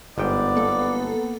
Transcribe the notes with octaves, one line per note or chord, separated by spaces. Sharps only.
G1 G#2 B3 D5 G5
A#3 A4